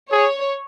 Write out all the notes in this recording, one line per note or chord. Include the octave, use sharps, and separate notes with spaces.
G#4 C#5